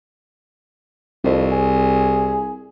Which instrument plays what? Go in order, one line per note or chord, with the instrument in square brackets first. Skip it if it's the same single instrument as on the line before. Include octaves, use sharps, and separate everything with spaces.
[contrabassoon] C2 [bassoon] F2
[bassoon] G#4